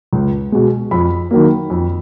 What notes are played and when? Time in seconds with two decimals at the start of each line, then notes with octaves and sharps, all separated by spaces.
0.13 C#2
0.52 B2 G#3
0.91 F2 B5
1.31 D#3 F#3 A#3
1.70 F2